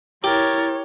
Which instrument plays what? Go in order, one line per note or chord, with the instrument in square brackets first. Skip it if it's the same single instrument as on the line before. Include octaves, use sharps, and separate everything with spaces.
[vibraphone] E4 [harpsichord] G4 [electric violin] A#4 A6 [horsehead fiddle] C#5